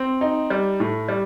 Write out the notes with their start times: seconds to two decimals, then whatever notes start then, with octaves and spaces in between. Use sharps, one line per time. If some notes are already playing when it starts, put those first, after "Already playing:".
Already playing: C4
0.21 D#4
0.50 G3
0.80 A2
1.08 G3